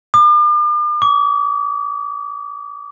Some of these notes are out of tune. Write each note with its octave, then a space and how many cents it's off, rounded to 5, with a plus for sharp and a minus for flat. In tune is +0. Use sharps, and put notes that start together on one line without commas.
D6 +40
D6 -40